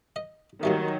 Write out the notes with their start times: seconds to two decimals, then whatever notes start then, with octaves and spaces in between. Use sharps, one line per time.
0.16 D#5
0.63 A#2 D#3 F#3 G3 A3